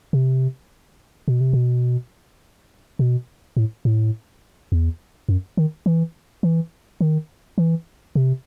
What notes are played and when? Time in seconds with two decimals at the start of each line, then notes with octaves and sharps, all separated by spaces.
0.13 C3
1.28 B2
1.41 C3
1.53 B2
2.99 B2
3.57 A2
3.85 A2
4.72 E2
5.29 F#2
5.57 D#3
5.86 E3
6.43 E3
7.01 D#3
7.58 E3
8.15 C3